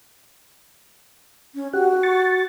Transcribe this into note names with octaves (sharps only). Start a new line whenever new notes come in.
C#4
F#4 G4 F#5
C#6 A6